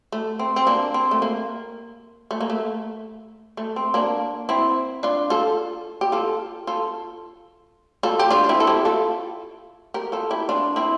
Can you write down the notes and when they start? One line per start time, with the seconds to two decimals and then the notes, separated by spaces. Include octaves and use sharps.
0.12 A3
0.39 C4
0.56 C4
0.67 A#3 D4
0.94 C4
1.11 A3
1.22 A#3
2.31 A3
2.41 A#3
2.50 A3
3.57 A3
3.76 C4
3.94 A#3 D4
4.49 C4 E4
5.03 D4 F4
5.30 F4 A4
6.01 G4
6.12 F4 A4
6.67 F4 A4
8.03 F4 A4
8.19 G4
8.30 D4 F4
8.44 F4
8.49 C4 E4
8.60 A4
8.67 E4 G4
8.85 F4 A4
9.94 G4 A#4
10.12 F4 A4
10.31 E4 G4
10.49 D4 F4
10.76 C4 E4